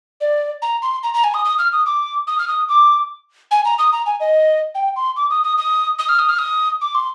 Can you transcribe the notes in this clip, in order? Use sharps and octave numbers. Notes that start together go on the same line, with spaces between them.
D5
A#5
C6
A#5
A#5
G#5
D#6
D#6
F6
D#6
D6
D#6
F6
D#6
D6
G#5
A#5
D#6
A#5
G#5
D#5
G5
C6
D6
D#6
D#6
D#6
D#6
F6
D#6
F6
D#6
D6
C6